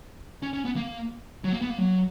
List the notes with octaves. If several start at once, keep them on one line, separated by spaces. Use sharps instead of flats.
C#4
C#4
B3
A#3
F#3
A#3
B3
A#3
F#3